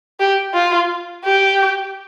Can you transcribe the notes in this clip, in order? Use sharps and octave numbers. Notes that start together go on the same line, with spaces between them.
G4
F4
G4